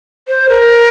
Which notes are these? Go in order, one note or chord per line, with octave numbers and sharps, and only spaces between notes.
C5
A#4